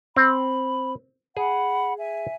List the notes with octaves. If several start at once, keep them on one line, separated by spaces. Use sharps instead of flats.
C4 B5
G#4 F#5 B5
E5 G#5